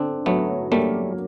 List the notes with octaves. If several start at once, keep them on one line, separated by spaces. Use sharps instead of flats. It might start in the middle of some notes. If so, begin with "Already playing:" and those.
Already playing: D3 C4 D4
F#3 A3 B3
G3 A3 A#3